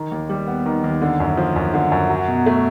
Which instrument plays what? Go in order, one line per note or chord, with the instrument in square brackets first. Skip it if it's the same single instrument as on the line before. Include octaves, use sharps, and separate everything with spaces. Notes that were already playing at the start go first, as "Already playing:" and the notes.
Already playing: [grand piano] D#3
D#2
G3
B3
D#3
D#2
D3
F#2
F3
F#2
D3
F#2
F#3
B2
A3